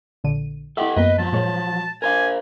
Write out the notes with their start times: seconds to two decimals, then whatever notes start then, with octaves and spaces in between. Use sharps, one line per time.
0.24 A#1 D3 D#7
0.77 E4 A4 D#5 E5 F#5 G5
0.96 F#2 A#3 B3 B4 D#5
1.18 F3 F#3 A5
1.32 A#2 G#3 C#5
2.02 A#4 C5 F5 G#5